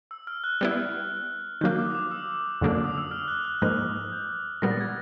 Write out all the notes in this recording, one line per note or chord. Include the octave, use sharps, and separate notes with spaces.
E6
F6
F#6
G3 B3 E4
D#3 F#3 A#3 G6
D6
D#6
D6
E6
F2 D3 F#3 A#3 D4
D#6
E6
F6
F#6
F#6
G#2 F3 A#3 D#4 F#6
G6
A#2 G3 B3 A#6
A6
G#6